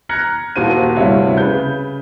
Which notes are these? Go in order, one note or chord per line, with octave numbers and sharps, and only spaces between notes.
A#5 F6 F#6 G#6 A#6 C#7
D#1 D#2 F#4 C5 F5 D#7
D2 G2 C3 E4 C#5 F5
C#3 B4 G6